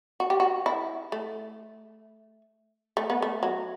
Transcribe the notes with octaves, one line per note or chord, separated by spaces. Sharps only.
F#4
G4
F#4
E4
A3
A3
B3
A3
F#3